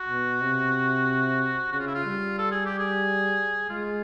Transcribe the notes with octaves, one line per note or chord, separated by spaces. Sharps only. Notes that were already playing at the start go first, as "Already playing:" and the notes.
Already playing: F#4
B2
C3
C#3 F#4
F4
E4
F4
G3
A4
G#4
G4
G#4
G#3 F4